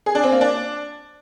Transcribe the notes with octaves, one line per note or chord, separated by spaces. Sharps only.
G#4
D4
C4
A#3
D4